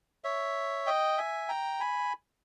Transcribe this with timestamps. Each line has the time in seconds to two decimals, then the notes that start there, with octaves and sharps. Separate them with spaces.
0.24 C#5 E5
0.87 D#5 G5
1.18 E5 G#5
1.48 G5 A#5
1.80 G#5 B5